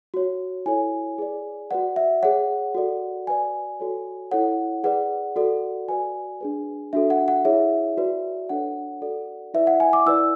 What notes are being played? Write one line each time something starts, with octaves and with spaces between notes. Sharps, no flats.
F#4 C#5
E4 A4 C#5 G#5
G#4 B4 D5
F#4 B4 D5 F#5
E5
G#4 C#5 F#5
F#4 A4 D5
F#4 B4 D5 G#5
F#4 A4 C#5
E4 A4 C#5 F#5
G#4 B4 D5 F#5
F#4 A4 D5
F#4 B4 D5 G#5
D4 G#4 B4
D4 F#4 A4 E5
F#5
F#5
E4 G#4 C#5 E5
F#4 B4 D5
D4 A4 C#5 F#5
F#4 A4 D5
E4 B4 D5 E5
F#5
G#5
D6
E4 B4 D5 E6